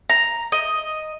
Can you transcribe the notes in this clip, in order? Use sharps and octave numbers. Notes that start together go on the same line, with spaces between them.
A#5
D#5